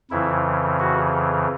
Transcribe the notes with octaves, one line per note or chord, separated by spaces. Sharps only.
F2 C#3 E3 E4
F#4